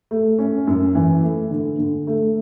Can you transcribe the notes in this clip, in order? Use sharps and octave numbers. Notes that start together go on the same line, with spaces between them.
A3
C#4
F#2
E3
A3
D3
D3
A3